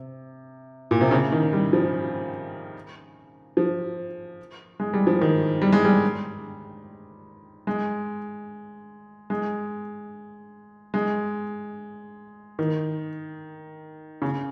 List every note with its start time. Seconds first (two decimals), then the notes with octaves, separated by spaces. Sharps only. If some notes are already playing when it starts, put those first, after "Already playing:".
Already playing: C3
0.91 A#2
1.01 C3
1.11 C#3
1.32 D#3
1.53 G3
1.73 F3
3.57 F3
4.80 G#3
4.93 G3
5.07 F3
5.21 D#3
5.62 G3
5.72 G#3
5.85 G3
7.67 G#3
9.30 G#3
10.94 G#3
12.59 D#3
14.22 C#3